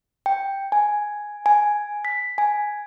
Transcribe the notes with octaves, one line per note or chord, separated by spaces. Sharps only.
G5
G#5
G#5
B6
G#5